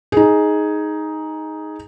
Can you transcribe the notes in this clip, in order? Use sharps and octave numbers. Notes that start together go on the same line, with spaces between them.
D#4 G#4